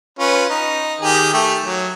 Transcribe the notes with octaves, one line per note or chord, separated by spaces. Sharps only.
C#4 F4 B4
D#4
D#3 G4 G#4
A3 G4
F#3